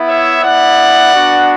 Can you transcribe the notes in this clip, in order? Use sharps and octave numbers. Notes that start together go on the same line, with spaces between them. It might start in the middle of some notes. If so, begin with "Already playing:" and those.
Already playing: B3 E4
C#5 E5
B3 E4 D5 F#5
B3 D4 F#4